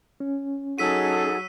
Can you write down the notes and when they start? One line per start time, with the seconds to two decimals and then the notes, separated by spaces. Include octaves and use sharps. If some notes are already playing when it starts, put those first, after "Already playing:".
0.20 C#4
0.78 F#3 D#4 G#4 A4 E6 B6 D#7